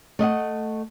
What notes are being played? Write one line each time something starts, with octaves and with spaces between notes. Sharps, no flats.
A3 D#5 E5 F#5